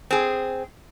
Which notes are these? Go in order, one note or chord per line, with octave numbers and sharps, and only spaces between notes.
C4 G#4